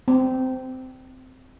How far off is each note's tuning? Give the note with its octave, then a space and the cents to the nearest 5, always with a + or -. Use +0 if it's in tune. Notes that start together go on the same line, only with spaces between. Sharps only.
C4 -15